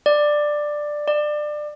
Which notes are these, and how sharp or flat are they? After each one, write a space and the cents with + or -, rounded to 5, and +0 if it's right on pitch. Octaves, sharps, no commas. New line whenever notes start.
D5 +10
D5 +25